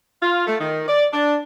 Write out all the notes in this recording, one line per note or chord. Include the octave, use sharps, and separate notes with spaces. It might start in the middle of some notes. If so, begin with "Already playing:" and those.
F4
A3
D#3
D5
D4